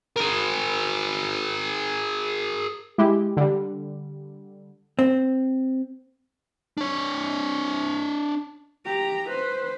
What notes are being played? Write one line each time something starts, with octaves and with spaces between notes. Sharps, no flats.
G#4 A#4
G#3 E4 G4
D3 G3
C4
D4 C#5
G4 A#5
B4 C5